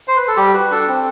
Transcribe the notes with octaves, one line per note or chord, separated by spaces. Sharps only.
C5
B4
A4
G3 G4
F#4 B4
D4 A4
C4